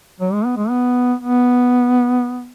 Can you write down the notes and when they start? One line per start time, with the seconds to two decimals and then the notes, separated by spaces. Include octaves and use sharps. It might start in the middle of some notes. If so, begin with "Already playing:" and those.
0.20 F#3
0.33 G#3
0.45 B3
0.57 G#3
0.70 B3
1.19 B3